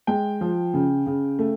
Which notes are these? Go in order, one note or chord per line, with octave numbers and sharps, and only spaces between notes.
G#3 G5
F3
C#3
C#3
A3